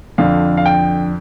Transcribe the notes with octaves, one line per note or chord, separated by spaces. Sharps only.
F2 D3 F5
F5
G5